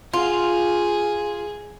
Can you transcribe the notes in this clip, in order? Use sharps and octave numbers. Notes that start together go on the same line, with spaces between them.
F4 G#4